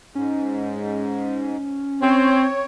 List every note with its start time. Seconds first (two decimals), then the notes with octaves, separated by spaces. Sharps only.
0.15 G#2 C#4
2.02 C4 C#5